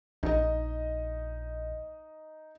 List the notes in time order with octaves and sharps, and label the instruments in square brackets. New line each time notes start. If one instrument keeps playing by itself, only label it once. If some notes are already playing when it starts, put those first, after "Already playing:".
[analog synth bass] A#1 [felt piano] D#4 D#5